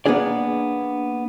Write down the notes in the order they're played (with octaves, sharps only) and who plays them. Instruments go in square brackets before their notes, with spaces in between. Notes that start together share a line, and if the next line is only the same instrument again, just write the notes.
[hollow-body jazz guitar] A#3 B3 C#4 D4 G#4 D5